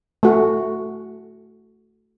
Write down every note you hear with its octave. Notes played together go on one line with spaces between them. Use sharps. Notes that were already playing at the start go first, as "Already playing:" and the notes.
A3 F#4